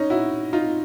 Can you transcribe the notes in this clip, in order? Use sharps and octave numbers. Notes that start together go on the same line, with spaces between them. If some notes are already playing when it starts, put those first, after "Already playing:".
Already playing: C#4 D#4
E4 F#4
D#4 F4